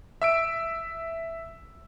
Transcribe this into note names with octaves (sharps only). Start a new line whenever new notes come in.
E5 E6 D7